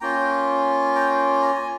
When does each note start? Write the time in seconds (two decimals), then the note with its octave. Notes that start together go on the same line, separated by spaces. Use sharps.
0.01 A#3 C#4 F4 G5 A#5
0.95 G5 A#5
1.42 A#5
1.55 G#5